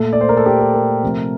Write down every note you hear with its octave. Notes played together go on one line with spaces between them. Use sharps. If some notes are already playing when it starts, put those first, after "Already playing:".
Already playing: A#2 A3 A4
D5
C5
A#4
A4
G4
A4
A#4
C3 F3 A3